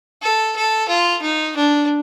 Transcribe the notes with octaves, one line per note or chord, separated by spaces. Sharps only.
A4
A4
F4
D#4
D4